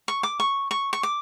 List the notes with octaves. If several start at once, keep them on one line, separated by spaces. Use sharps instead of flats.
C#6
D6
C#6
C#6
C#6
D6